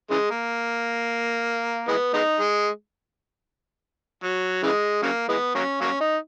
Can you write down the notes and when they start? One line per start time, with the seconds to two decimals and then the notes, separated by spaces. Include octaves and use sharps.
0.11 C#3 E3 G#3
0.30 A#3
1.88 E3 G#3 B3
2.14 G#3 B3 D#4
2.40 G#3
4.24 F#3
4.63 C#3 E3 G#3
5.03 C#3 F#3 A#3
5.29 E3 G#3 B3
5.55 F#3 A#3 C#4
5.81 F#3 A#3 C#4
6.00 D#4